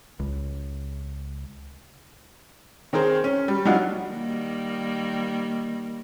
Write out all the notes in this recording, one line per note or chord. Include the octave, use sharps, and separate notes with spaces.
C#2
D#3 C4 G#4 A#4 C5
C#4
G3
F#3 G3 D4 D#4 F4 F#4
D#3 G3 A#3